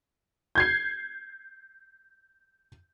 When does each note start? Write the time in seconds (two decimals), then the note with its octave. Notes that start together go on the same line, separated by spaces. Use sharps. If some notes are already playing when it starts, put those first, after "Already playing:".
0.55 G6 G#6 C7